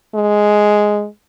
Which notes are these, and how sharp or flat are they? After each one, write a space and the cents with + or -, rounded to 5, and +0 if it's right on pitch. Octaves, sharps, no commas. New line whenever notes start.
G#3 +5